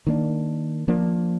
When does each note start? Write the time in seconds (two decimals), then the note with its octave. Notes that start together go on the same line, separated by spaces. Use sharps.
0.07 D#3 A#3 D4
0.88 F3 A#3 D4